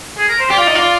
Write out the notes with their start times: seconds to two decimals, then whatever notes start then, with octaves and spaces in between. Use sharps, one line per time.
0.17 G#4
0.29 A#4
0.39 C5
0.50 G4 D5
0.58 F4
0.67 D#4
0.75 F4 D5